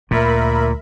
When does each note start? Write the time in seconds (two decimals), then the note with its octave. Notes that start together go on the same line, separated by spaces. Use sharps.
0.11 D2 A#2 A#4 E5 B5